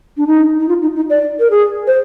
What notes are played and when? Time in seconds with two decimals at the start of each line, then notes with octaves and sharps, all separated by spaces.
0.17 D4
0.27 D#4
0.60 D#4
0.68 F4
0.82 D#4
0.96 D#4
1.10 D5
1.39 A#4
1.50 G#4
1.87 C5